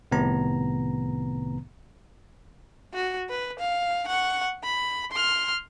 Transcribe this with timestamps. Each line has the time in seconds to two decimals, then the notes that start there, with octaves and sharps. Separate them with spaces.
0.11 C2 A2 C3 D#3 B3 A#5
2.94 F#4
3.29 B4
3.59 F5
4.07 F#5 C#6
4.64 B5
5.12 C6 F6